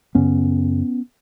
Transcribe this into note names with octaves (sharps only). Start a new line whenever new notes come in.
F#2 C#3 B3 C#4